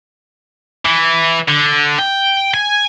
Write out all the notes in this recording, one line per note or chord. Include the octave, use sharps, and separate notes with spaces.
E3
D3
G5
G#5